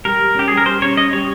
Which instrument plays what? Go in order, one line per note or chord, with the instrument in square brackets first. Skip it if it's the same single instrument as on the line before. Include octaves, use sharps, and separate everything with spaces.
[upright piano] G3 [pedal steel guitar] A#4
[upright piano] G3
[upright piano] C#4 [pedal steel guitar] G4
[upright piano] G3 [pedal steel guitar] G#4
[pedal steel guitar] A#4
[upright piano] G3 [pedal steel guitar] C5
[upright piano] C#4 [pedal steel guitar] C#5
[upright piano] C#4 [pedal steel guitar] D#5
[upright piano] G3 [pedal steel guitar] C#5